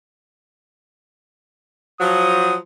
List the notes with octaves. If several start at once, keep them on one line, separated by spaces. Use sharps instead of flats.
F3 F#3 D#6